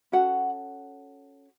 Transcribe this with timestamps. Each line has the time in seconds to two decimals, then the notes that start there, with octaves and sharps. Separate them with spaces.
0.12 C#4 F#4 A4 F#5